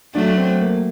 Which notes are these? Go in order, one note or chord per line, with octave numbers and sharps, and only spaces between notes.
F#3 A3 D4
C4
A#3